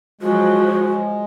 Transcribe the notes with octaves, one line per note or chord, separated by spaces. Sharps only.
F3 F#3 G#3 F#4